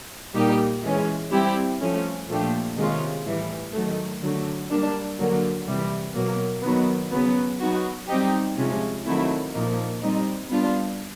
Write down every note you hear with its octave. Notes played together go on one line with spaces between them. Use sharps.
A#2 G3 A#3 D#4 G4
E3 G#3 C#4
G3 C4 E4 G4
F3 A3 C#4
A#2 F3 A3 D4 G4
C3 D#3 G#3 C#4 F4
A2 E3 G3
D#3 F#3 A3
D3 F#3 A3
G3 A#3 D4
D3 F#3 A#3
C3 E3 G3
B2 F#3 A#3
D#3 F#3 B3
C#3 F#3 B3
F#3 B3 D#4 F#4
G3 C4 D#4 G4
C3 F3 G#3 C#4
D#3 F#3 A3 C4 E4
A#2 F3 A#3 D#4
G3 C4 D#4
G3 B3 D4 F4